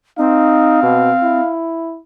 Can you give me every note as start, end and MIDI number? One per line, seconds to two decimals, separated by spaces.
0.18 1.40 60
0.18 0.81 63
0.18 1.53 77
0.83 1.11 47
1.23 1.99 64